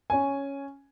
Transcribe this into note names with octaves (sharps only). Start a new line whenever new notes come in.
C#4 G#5